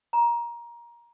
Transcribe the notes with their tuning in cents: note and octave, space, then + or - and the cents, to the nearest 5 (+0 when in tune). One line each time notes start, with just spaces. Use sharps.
A#5 +20